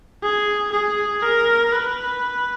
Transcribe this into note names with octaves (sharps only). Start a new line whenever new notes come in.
G#4
G#4
A#4
B4